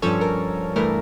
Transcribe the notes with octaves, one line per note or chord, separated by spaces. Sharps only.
G2 F3 C#4 A4 C#5
A#4
G2 E3 A3 A#4